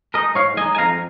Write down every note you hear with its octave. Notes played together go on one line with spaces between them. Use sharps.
G#3 D#4 A#4 D#5
G#2 C#5 F5
G#3 D#4 D#5 G#5
G#5
F2 F5 A#5